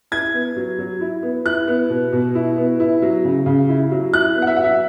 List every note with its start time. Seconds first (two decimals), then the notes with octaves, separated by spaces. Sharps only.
0.12 E4 G#6
0.34 B3
0.57 F#3
0.79 F#3
1.01 E4
1.23 B3
1.46 E4 F#6
1.68 B3
1.90 B2
2.13 B2
2.35 E4
2.57 B3
2.80 E4
3.02 F#3
3.25 C#3
3.46 C#3
3.69 E4
3.91 F#3
4.13 E4 F#6
4.36 B3
4.42 F#5
4.47 E5
4.56 F#3 F#5
4.64 E5